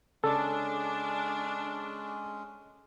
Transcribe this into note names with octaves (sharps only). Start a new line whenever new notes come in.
C#3 G#3 C#4 D4 A4 D5 D6